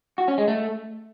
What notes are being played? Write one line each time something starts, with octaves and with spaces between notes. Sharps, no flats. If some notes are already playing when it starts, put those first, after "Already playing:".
F#4
C#4
G#3
A3